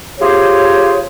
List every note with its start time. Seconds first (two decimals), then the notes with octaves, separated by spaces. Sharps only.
0.19 F4 G4 G#4 C5 C#5